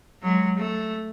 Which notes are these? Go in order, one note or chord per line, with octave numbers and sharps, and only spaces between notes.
F#3 G#3
A3